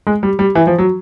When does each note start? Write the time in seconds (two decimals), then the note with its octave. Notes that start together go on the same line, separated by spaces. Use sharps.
0.07 G#3
0.23 G3
0.39 G3
0.55 E3
0.67 F3
0.78 F#3